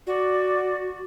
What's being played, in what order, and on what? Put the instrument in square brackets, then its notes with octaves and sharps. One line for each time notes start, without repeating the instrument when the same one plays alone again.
[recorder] F#4 [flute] D5